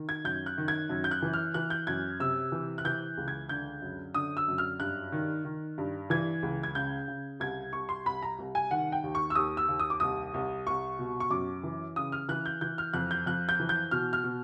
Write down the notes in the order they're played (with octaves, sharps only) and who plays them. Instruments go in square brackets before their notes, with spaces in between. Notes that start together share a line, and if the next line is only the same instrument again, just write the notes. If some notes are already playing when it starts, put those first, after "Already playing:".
Already playing: [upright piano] D#3
G#6
F#2 G6
F#6
D#3
G#6
F#2
G6
F#6
E3
F6
E3 F#6
G6
F#2 G#6
C3 E6
E3
F#6
E3 G6
C#2
G#6
D3 G6
F#2
D3 D#6
E6
F#2
F6
G2 F#6
D#3
D#3
G2
E3 G#6
C#2
G#6
C#3 G6
C#3
C2 G#6
C2 C#6
C6
C2 B5
A#5
C2
G#5
D#3 F#5
G5
D#2
C#6
E6
D#2 D#6
E6
D#2
D#6
D6
C2 D#6
C2
C2 C#6
B2
C#6
F#2 D6
E3
C#3 D#6
F6
E3 F#6
G6
E3 G6
F6
F2 F#6
G6
F2 F#6
G6
E3
G6
B2 F6
F6
B2